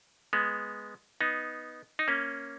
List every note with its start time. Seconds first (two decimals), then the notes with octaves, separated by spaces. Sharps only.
0.33 G#3 B3
1.21 B3 D#4
1.99 D#4
2.08 A#3 C#4